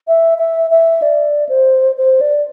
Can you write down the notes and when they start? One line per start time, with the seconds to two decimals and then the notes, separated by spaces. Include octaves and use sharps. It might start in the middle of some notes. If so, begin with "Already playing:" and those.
0.08 E5
0.38 E5
0.71 E5
1.02 D5
1.49 C5
1.97 C5
2.21 D5